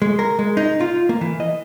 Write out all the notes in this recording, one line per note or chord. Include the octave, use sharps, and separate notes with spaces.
G#3
A#4
G#3
D#4
F4
A#3
E3
D#5